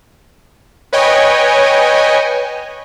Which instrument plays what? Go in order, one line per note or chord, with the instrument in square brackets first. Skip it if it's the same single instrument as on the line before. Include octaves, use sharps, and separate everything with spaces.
[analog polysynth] B4 C#5 D#5 G5 G#5